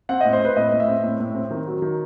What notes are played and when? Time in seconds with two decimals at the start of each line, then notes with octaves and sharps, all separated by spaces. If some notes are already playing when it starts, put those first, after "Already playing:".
0.09 C4 F#5
0.21 A2 D#5
0.33 C5
0.40 C4 B4
0.56 A2 D#5
0.72 A2
0.80 E5
0.88 C4
1.04 A2
1.20 A2
1.35 C4
1.51 D#3
1.67 F#3
1.82 D#3